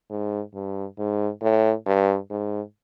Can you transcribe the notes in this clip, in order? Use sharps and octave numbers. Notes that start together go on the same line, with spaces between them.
G#2
G2
G#2
A2
G2
G#2